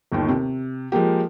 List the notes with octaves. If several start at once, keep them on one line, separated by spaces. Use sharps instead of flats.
G1 D#2 D#3
C3
F3 G#3 A#3 G4